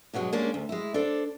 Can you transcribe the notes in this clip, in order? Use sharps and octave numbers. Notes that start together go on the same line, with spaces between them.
G2 B2 F#3 G#3
G#3 A#3 C#4 D4
D2
G#3 E4
D4 A4 C5 D5